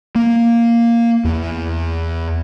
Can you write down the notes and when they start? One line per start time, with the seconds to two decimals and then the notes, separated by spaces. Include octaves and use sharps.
0.15 A#3
1.25 E2